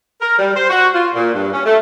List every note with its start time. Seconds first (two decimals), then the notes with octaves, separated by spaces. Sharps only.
0.21 A#4
0.39 G3
0.55 C5
0.70 F#4
0.95 F4
1.15 A#2
1.34 G2
1.53 C#4
1.65 A3